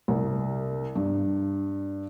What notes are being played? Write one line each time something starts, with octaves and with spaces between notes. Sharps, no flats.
C2
G2